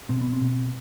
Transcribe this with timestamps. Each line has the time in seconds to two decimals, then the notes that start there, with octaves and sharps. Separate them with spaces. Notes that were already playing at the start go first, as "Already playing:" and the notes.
0.09 B2 C4
0.21 B3
0.33 C4
0.41 B2